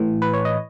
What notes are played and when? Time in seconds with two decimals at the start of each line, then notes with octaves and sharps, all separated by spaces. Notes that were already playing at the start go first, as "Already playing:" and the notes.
Already playing: A2 E3
0.22 B4
0.33 C#5
0.45 D#5